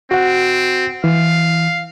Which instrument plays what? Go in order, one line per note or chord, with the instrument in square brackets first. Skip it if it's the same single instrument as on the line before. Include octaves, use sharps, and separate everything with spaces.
[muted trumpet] C4 [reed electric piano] F#4 F#5
[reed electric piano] E3 [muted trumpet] F5